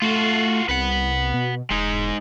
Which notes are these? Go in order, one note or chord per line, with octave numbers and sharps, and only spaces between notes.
A3 F4 F#4
C2 B4 F#5
B2
E1 G#3 D#4